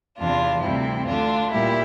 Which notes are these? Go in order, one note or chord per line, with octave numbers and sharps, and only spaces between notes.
E2 C3 E3 D4 F4
D2 C3 E3 G3 C4 E4
D2 D3 A3 D4 F4
A#2 G3 A#3 E4 G4